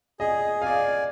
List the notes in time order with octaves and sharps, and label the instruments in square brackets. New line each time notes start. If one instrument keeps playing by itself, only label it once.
[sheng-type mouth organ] G#4 [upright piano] D#5
[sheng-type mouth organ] D5 G#5 [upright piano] F5